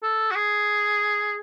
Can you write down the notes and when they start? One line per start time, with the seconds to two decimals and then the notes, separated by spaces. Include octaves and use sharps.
0.03 A4
0.31 F#4
0.35 G#4